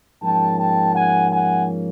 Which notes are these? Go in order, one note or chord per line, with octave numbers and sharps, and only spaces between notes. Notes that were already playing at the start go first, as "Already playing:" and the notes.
G#2 F3 A#3 C#4 G5 A5
G5 A5
F#5 G#5
F#5 G#5